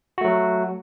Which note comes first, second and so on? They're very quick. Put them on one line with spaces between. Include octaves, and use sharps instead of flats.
F#4 A3 F#3